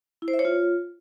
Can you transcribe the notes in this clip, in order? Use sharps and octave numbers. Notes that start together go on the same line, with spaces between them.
E4
C5
E5
C#5
F4